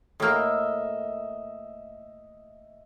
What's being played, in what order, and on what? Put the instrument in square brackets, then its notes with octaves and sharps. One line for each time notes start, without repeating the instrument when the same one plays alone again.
[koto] A2 A#3 [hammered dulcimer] D#5 E5